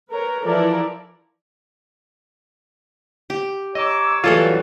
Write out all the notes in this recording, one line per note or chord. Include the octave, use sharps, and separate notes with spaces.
A#4 B4 C#5
E3 F3 E4 A4 A#4 D5
G4
C#5 D#5 A#5 D6 E6
E2 E3 F#3 G3 A3 F4 A4